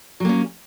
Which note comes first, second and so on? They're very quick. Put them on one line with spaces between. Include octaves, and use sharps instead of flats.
F#3 A#3 C#4